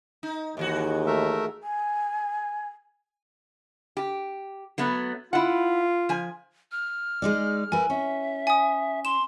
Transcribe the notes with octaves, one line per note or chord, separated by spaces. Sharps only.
D#4
D#2 G#2 E3 F#4
A3 A#4 E5
G#5
G4
F#3 A3 B3
E4 F4 F#5
F3 G#5
F6
G#3 D#4 D5
E4 A#4 B4 G#5
C#4 E5
G#5 D#6
C6 E7